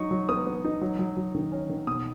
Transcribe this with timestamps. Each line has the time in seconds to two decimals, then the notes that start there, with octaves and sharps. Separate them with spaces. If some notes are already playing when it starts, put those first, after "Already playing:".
Already playing: F#3 D#4 C#6
0.11 F#3
0.29 B3 D#6
0.46 B3
0.65 D#4
0.81 F#3
0.99 F#3
1.17 F#3
1.35 D#3
1.52 C#4
1.70 D#3
1.87 B2 D#6